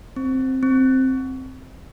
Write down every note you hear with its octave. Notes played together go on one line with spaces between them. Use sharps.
C4
C4